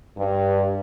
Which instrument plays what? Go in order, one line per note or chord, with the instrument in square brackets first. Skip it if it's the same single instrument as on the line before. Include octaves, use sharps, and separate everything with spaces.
[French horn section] G2